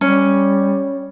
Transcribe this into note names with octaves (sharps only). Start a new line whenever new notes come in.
G3 C#4